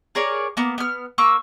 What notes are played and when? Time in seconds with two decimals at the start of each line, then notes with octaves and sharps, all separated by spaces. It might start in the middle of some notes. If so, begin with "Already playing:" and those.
0.15 G#4 A#4 C#5 D5
0.57 A#3 B3
0.78 B3 F6
1.18 A#3 C#6 E6